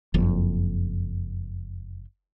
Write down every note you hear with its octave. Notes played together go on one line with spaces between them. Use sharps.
F#1 F2